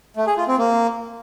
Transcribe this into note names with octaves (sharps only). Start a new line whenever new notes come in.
A3
G#4
F4
C4
A#3